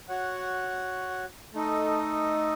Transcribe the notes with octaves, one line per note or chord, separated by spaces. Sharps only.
F#4 C#5 F#5
A3 D#4 A4 D#5